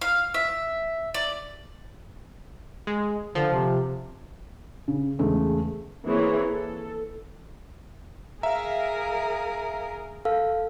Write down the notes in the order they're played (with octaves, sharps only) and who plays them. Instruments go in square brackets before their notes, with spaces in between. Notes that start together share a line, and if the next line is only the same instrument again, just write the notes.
[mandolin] F5
E5
D5
[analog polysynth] G#3
[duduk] D3 [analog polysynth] F3
[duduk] C3
[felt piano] C#3
E2 C#3 G#3 A3
[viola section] E3 A#3 C4 G#4 C#5
A4
[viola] G#4 A#4 [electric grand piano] E5 F5 [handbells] A#5
[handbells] A4 [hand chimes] F5